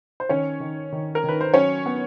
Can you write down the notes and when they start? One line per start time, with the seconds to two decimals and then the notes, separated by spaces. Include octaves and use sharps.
0.20 C5
0.29 D#3 C#4 C#5
0.60 D#3
0.92 D#3
1.15 A#4
1.24 D#3 B4
1.41 C5
1.54 F#3 C#4 C#5
1.86 B3